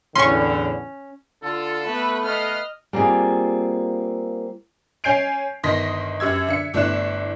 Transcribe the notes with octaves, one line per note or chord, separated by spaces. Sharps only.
E2 A2 D3 C#4 C6 C#6
D3 F4 A4
A3 B3 B4
B3 B4 D#5 F5 F6
G3 A#3 C4 F4 G#4
C#4 G#5 G6 C7 D7 F7
G1 D#3 D#5 C6 A#6 B6
F#2 G4 E6 G#6
D3 E5 C#7
G1 A3 D4 E4 F#6 E7